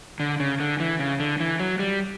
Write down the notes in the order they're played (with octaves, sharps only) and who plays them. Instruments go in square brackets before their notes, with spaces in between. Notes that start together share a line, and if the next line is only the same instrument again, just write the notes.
[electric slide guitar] D3
C#3
D3
E3
C#3
D3
E3
F#3
G3